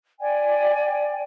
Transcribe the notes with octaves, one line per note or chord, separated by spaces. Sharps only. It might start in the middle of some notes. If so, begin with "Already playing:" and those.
D5 G5 G#5